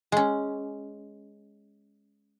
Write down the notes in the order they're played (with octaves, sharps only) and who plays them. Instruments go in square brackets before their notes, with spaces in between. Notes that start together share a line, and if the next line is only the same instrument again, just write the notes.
[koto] G#3 C#4